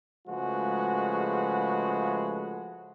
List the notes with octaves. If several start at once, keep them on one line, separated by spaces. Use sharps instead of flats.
C#3 F3 G#3 A3 F#4 B4